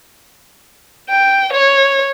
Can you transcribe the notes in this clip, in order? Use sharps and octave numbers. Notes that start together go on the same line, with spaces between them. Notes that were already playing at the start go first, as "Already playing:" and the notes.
G5
C#5